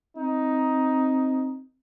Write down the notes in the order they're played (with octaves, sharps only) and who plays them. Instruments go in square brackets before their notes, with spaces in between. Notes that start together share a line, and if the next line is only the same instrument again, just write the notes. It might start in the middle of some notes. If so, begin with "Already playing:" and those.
[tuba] C4 [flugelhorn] D#4